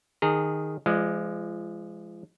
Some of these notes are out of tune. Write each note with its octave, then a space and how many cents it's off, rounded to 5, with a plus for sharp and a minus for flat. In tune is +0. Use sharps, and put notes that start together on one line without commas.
D#3 +0 G#4 -10 A#5 -35
F3 -35 G#3 +0 D5 +25